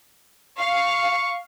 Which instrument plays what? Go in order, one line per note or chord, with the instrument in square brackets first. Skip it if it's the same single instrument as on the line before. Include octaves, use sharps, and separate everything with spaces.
[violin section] F5 [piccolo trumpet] C#6